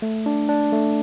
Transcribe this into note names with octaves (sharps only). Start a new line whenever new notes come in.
A3
D4
D4
A3